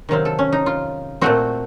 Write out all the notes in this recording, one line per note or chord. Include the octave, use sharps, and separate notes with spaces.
C3 D#3 F#3 C4 F5
A4
C#4
D#4
F4
A#2 A3 C4 F#4